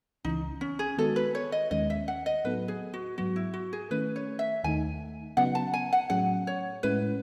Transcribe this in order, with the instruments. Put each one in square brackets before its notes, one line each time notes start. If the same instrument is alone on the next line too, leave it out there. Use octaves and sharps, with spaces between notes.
[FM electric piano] C#2 C#3 E3 [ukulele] D#4
[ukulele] C#4
G#4
[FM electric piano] D#3 G#3 B3 D#4 F#4 [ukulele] A4
[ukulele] B4
C#5
D#5
[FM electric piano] D#2 D#3 G#3 C#4 [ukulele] D#5
[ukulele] E5
F#5
D#5
[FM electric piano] A2 F#3 B3 D#4 A4 [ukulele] B4
[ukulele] G#4
F#4
[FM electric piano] G#2 F#3 B3 [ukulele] F#4
[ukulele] E4
F#4
G#4
[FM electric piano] D#3 A3 C#4 E4 [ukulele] B4
[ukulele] C#5
E5
[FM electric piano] D#2 D#3 A3 D#4 [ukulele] G#5
[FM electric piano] C#3 F#3 B3 D#4 [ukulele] F#5
[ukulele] A5
G#5
F#5
[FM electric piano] A2 F#3 C#4 G#4 [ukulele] F#5
[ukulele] C#5
[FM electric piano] A2 G#3 C#4 E4 [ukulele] B4